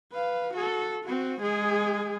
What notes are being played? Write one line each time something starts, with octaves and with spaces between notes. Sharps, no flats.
B4 F5
F#4 A4
C4 F#4
G#3 G#4